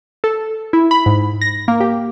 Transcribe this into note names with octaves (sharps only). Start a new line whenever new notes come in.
A4
E4
B5
G#2
A#6
A#3
G4